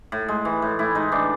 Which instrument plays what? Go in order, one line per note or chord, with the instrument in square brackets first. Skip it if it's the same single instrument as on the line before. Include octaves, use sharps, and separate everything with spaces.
[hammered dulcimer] A2
G#3
E3
A2
A2 E4
G#3 D#4
E3 D4